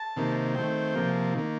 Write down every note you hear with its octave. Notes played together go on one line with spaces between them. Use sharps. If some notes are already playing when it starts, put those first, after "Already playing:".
Already playing: A5
C3 D#3 A#3
D#3 A3 C4 G5
C3 F3 A#3
D#3 A#3